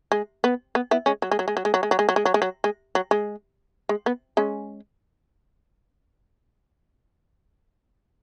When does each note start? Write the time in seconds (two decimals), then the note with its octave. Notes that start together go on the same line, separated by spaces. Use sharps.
0.12 G#3
0.44 B3
0.75 B3
0.91 B3 E4
1.06 G#3 C#4
1.22 F#3
1.31 G#3
1.39 F#3
1.48 G#3
1.57 F#3
1.65 G#3
1.74 F#3
1.83 G#3
1.91 F#3
1.99 G#3
2.09 F#3
2.16 G#3
2.25 F#3
2.34 G#3
2.42 F#3
2.64 G#3
2.95 F#3
3.11 G#3
3.89 G#3
4.06 B3
4.37 G#3 C#4